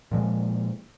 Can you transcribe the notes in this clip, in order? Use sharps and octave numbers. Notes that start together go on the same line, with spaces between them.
A#2 F3 G#3